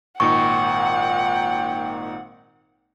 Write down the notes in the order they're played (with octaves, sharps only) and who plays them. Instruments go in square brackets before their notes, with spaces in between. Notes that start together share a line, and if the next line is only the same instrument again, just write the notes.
[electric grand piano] G#1 A#2 D#4 [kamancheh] F#5 [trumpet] G5 [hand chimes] C#6